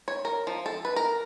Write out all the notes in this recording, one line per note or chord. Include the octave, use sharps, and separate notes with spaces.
C#5
A#4
F3
A4
B4
A#4